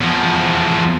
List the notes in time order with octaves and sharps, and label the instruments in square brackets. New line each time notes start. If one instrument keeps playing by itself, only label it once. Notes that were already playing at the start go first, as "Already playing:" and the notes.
[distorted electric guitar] E2 F3